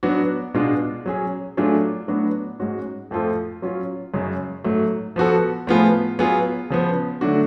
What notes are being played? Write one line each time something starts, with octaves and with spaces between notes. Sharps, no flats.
F#3 B3 D4 F#4
B2 G#3 D4 F4
F#3 C#4 G#4
F#3 A3 D4 F4 G#4
A2 F#3 B3 D4 F#4
G#2 G#3 C#4 F#4
F2 F3 A3 F4 A4
F#3 C#4 F4
F#2 C#3 G#3 C#4
G#2 F#3 A3
F3 B3 F#4 A4
A2 F3 B3 F4 G#4
F#3 B3 F4 G#4
C#3 F3 B3
D3 F#3 A3 D4 F#4